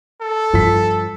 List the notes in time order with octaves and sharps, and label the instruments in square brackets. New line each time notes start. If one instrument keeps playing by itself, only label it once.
[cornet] A4
[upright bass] G2 [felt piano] F3 B6